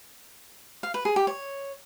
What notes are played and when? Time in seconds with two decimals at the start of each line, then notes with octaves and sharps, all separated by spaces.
0.83 F5
0.94 B4
1.05 G#4
1.16 G4
1.27 C#5